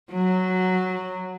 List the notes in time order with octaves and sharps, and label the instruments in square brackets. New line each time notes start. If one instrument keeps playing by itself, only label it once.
[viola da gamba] F#3